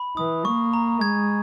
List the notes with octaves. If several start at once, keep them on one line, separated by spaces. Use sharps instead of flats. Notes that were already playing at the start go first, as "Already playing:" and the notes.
Already playing: B5
E3 D#6
A#3 C#6
A#5
G#3 G#6